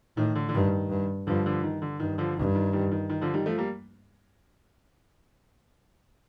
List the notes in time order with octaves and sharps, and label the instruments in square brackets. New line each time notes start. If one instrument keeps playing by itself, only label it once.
[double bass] A2 [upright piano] D#3
[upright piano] D3
D3
[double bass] G2 [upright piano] D#3
[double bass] G2
[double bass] G2 [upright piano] D3 F3
[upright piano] D3 F3
D#3
D3
[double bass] G2 [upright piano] D#3
[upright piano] D3 F3
[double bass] G2 [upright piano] D#3
[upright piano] D#3
D#3 G3
D#3
D#3
D3 F3
D#3 G3
F3 A3
G3 A#3